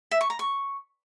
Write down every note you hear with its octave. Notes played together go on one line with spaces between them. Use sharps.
E5
C#6
A#5
C#6